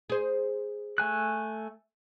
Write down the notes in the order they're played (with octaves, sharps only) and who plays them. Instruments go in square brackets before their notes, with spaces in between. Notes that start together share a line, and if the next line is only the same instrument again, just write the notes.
[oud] G#4 C5
[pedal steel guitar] A3 G#5 F#6